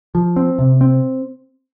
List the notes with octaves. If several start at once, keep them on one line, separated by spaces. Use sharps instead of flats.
F3
C4
C3
C4